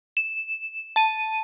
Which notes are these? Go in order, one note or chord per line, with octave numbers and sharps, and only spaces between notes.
E7
A5 D#7